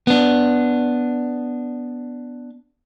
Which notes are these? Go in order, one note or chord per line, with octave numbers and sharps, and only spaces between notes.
B3 D4